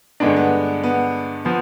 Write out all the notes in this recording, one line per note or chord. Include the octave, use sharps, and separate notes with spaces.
G2 D3 G#3 B3 D4
B3
B3
F3 B3